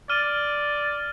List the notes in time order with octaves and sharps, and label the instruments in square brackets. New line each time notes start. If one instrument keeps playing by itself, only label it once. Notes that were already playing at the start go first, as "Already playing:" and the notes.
[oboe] D5 [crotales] F6 D#7